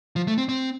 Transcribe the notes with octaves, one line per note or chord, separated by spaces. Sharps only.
F3
A3
C4
C4